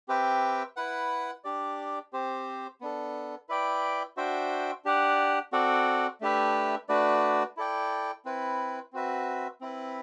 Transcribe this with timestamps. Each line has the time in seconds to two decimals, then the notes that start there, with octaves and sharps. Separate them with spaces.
0.08 C4 G4 B4 E5 G5
0.76 E4 B4 F#5
1.44 D4 G4 D5
2.13 C4 G4 C5
2.81 B3 D4 A4
3.49 E4 B4 D5 G5
4.17 D4 F#4 C5 E5 G5
4.85 D4 G4 D5 F#5
5.52 C4 F#4 A4 D5 F#5
6.21 A3 D4 G4 B4 E5
6.89 A3 D4 F#4 B4 D5
7.57 E4 A4 D5 G5
8.25 C4 E4 B4
8.93 C4 F#4 B4 E5
9.61 C4 E4 B4